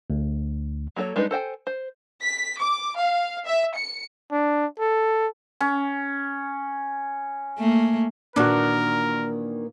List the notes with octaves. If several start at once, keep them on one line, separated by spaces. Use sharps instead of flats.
D2
F#3 A#3 A4 A#4 C#5
G3 G#3 D4 D#4 B4
A4 C5 G5 G#5
C5
B6
D6
F5
E5
C#7
D4
A4
C#4
A3 A#3
A#2 D#3 E3 D4 F#4 A#4